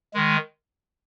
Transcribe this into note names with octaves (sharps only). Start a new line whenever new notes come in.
D#3 G#3